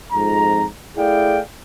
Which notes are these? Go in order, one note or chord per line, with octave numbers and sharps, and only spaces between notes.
F2 G#2 A#5
A3 E4 G#4 D5 F5 G5